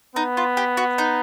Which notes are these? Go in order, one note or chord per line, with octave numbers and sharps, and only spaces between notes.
B3 D#4
F4
G4
F#4
D#4